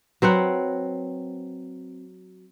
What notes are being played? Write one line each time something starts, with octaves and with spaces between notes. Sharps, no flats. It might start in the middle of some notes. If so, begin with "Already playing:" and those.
F#3 C4 B4 F#5